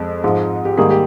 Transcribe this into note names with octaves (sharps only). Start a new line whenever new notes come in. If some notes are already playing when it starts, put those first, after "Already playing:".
Already playing: F2 G#3
G#2 F3 G#3
G4
G#2 D#3 G3 A#3 G#4
G4